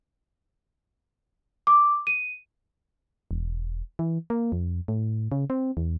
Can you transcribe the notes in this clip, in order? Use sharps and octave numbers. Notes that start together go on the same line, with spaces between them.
D6
D#7
E1
E3
A#3
F2
A2
C#3
C4
E2